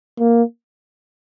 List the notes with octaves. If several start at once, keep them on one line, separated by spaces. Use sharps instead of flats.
A#3